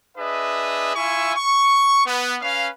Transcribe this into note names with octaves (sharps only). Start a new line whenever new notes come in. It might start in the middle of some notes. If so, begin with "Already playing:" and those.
D4 G#4 B4 D#5 E5
E4 F4 E5 G#5 C#6
C#6
B3
C#4 B4 F5